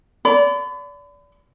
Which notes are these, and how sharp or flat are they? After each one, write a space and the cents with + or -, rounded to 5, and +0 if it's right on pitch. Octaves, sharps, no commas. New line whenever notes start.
D5 -30 B5 +40